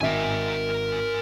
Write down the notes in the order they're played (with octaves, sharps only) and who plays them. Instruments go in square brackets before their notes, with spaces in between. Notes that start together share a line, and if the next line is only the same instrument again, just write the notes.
[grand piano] G#1 E5 [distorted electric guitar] A#4 G#5